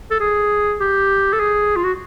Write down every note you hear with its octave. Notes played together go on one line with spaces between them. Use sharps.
A4
G#4
G4
A4
G#4
F4
F#4